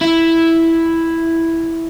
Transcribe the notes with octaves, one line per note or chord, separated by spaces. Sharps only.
E4